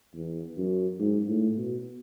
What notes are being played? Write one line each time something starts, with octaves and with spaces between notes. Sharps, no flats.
E2
F#2
G#2
A2
B2